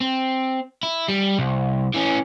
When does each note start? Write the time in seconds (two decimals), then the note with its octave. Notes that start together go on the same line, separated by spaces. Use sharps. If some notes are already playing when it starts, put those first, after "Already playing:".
0.01 C4
0.83 E4
1.08 G3
1.39 C2
1.94 E3 C#4